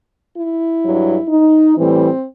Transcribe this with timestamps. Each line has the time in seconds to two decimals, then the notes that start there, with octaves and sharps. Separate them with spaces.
0.36 E4
0.83 G2 F#3
1.29 D#4
1.76 A2 E3 G3 C4